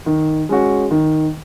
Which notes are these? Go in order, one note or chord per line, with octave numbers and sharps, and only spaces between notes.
D#3
G#3 C#4 F#4
D#3